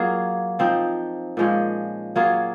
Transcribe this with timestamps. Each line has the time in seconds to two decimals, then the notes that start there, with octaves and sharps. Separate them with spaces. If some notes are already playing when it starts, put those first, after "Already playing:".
Already playing: F#3 A#3 F4 G#4
0.59 F3 C4 D#4
1.37 A#2 F3 G#3 C#4
2.16 F#3 A#3 F4 G#4